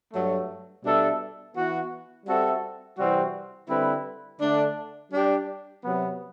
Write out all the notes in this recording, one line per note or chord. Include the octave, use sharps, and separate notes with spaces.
G2 F#3 A3
B2 G3 D4 A4 E5
E3 B3 F#4
G3 C4 F#4 A4 E5
C3 E3 G3 C4 F#4
D3 G3 C4 E4 B4
D3 A3 D4
G3 D4 G4
C3 F#3 B3